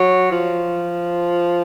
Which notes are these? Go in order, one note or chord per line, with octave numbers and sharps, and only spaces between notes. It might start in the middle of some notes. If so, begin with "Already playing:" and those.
Already playing: F#3
F3